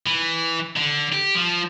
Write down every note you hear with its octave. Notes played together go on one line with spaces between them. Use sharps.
E3
D3
G4
F3